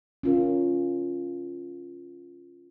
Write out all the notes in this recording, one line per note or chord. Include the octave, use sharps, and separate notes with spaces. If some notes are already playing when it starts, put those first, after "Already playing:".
C#4 F4 A#4